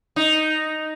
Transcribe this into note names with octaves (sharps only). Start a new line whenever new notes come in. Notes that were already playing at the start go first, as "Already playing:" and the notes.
D#4